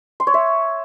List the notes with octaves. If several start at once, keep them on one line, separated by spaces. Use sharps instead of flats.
C6
C#5
E5